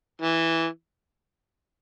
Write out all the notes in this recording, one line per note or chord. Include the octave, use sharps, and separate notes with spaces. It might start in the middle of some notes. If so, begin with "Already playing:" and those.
E3